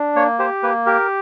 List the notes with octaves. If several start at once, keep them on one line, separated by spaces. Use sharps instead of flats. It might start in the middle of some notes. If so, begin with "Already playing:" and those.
Already playing: D4
A#3 C#5
G4 C5
A#3 B4
G4 A#4